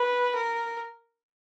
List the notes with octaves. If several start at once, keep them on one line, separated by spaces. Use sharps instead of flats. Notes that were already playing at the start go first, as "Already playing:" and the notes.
Already playing: B4
A#4